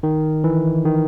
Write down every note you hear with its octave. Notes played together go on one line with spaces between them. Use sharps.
D#3
E3
D#3